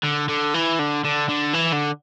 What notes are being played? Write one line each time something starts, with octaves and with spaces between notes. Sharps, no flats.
D3
D3
E3
D3
D3
D3
E3
D3